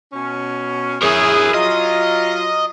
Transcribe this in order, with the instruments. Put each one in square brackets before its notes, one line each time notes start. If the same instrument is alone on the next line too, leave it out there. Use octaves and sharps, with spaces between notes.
[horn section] B2 C#4
[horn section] E4 G#4 [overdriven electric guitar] A#4 C#5
[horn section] F#3 F4 [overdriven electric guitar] D#5